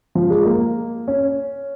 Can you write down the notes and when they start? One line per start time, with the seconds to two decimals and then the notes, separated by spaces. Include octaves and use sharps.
0.15 F3
0.30 G#3
0.45 A#3
1.08 C#4